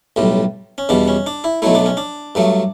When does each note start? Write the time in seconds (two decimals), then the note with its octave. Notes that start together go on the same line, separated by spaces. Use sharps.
0.16 B1 A2 G3
0.78 C#4
0.89 E2 B2 G3 D4
1.08 C#4
1.27 D4
1.44 E4
1.62 B1 B2 F#3 A3 E4
1.75 D4
1.86 C#4
1.97 D4
2.35 G2 F#3 A3